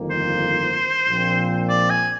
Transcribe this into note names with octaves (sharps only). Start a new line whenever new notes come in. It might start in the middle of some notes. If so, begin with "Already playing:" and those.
Already playing: G1 F2 D#3 A#3
C5
A#1 A#2 F3 C4
D5
G#5